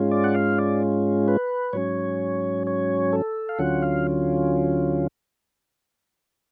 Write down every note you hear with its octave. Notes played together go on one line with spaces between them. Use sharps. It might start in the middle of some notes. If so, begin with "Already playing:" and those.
Already playing: G#2 G#3 C#4 F4
D5
F#5
F5
D5
B4
G#2 F#3 C#4 C#5
C#5
A4
F5
D2 D3 F#3 C#4 F4 F#5
F5